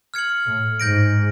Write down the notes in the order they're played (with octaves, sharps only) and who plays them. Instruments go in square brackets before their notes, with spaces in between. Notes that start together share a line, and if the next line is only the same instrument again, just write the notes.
[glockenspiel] F6 G#6 C#7 F#7
[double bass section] A2
[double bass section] G#2 [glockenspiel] G6 A#6 D7